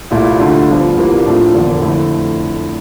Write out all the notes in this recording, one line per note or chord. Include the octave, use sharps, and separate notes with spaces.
C2 A#2 A3 E4
D2 D3 A3 D4 F4
G1 G2 F3
C2 C3 E3 A#3 F4
A2 F3 A3 D4 F4
F1 E2 D3 F3 A#3
F2 D3 A3 E4